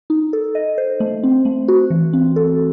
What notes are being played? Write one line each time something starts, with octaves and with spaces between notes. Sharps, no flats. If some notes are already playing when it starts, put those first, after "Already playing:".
D#4
A4
D#5
C5
A3
C4
A3
F#4
E3
C4
A4